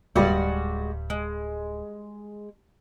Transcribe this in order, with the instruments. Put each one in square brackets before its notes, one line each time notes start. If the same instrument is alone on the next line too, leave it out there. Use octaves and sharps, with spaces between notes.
[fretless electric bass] D1 [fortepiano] G2 G3 [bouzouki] G#3 F#4 D5
[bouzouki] G#3